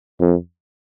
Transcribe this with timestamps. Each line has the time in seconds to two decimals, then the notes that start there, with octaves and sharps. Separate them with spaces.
0.21 F2